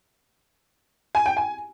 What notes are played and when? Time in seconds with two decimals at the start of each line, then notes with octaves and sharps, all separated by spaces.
1.15 G#5
1.26 G5
1.37 G#5